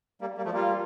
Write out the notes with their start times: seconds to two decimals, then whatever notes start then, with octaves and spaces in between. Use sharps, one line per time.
0.21 G3 A#3
0.37 G3 A#3
0.45 F3 A3
0.53 G3 A#3 F4